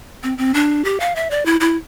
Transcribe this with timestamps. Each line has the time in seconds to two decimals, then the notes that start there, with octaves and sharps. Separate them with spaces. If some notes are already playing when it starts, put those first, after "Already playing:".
0.23 C4
0.38 C4
0.54 D4
0.85 G4
1.00 F5
1.16 E5
1.31 D5
1.46 E4
1.60 E4